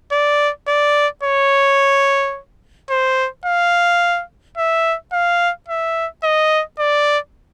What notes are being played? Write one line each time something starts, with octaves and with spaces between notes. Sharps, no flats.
D5
D5
C#5
C5
F5
E5
F5
E5
D#5
D5